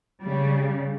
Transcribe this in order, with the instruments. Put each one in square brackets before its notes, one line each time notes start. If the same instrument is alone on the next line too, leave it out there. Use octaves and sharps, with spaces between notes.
[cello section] C#3 G3